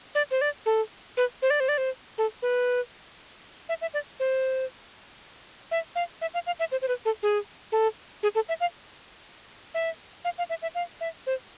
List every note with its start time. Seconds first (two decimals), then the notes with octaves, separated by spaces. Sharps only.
0.15 D5
0.31 C5
0.41 D5
0.66 A4
1.17 B4
1.42 C5
1.50 D5
1.60 C5
1.69 D5
1.78 C5
2.18 A4
2.42 B4
3.69 E5
3.81 E5
3.94 D5
4.20 C5
5.71 E5
5.95 F5
6.21 E5
6.34 F5
6.47 F5
6.60 E5
6.72 C5
6.82 C5
6.88 B4
7.05 A4
7.23 G#4
7.72 A4
8.23 G#4
8.35 A4
8.49 E5
8.60 F5
9.74 E5
10.25 F5
10.38 F5
10.50 E5
10.62 E5
10.75 F5
11.01 E5
11.27 C5